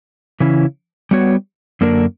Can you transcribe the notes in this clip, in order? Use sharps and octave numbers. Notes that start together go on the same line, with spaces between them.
C#3 E3 C#4 E4
G3 B3 F#4 C#5
F#2 D3 A#3 D4 A#4